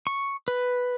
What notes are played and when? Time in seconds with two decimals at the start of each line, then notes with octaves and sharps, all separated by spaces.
0.07 C#6
0.48 B4